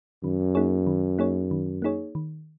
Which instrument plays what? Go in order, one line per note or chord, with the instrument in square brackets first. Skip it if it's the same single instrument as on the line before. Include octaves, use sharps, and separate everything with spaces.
[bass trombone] F#2 [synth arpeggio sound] D#3
[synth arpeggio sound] A#3 D#4 G#4 C#5
D#3
A#3 D#4 G#4 C#5
D#3
A#3 D#4 G#4 C#5
D#3